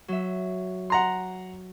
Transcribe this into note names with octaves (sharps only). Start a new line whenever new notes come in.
F#3 E5
F#5 A#5 C6